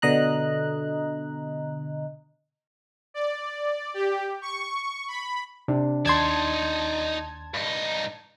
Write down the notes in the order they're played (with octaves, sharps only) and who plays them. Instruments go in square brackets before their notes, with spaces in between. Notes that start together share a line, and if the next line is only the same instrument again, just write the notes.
[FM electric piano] B2 D3 D#5 A#5 F#6
[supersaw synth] D5
G4
C#6
B5
[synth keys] C3 [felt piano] D4
[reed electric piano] D#2 C6 [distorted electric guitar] D#4 D5 [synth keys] A5 G#6
[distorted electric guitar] G2 D#4